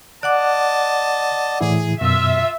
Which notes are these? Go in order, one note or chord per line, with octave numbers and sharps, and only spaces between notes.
D5 D#5 F#5 A5 D6 F#6
A2 E3 E4 G#4
F#2 B2 F4 E5